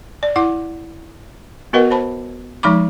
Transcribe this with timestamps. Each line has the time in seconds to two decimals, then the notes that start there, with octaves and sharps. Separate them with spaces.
0.23 D5
0.36 E4 F#5 D6
1.73 B3 F#4 A#4 B4 D#5 F#5
1.90 C5 A5 B5
2.63 F3 G#3 D#4 B5 D6